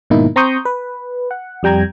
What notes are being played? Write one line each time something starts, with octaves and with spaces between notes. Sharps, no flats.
G#2 B2 D#3 A#3 D#4 E4
C4 A#5 C6 C#6 D#6 G6
B4
F#5
F2 G3 G5 A#5 G#6